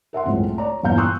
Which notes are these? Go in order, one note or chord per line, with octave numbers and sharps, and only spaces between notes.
A#4 E5 F#5 C6
F#1 C#2 A2 G#3 C4
A3
C#5 D5 A#5
G1 E2 A#2 F5 A#5 G6
C6 C#6 D#6 E6 F#6